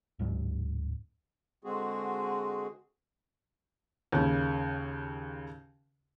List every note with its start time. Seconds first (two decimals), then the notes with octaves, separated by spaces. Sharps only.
0.19 D1 G#2 F#3
1.64 D3 G#3 C4 F#4 G#4
4.12 D#2 C#3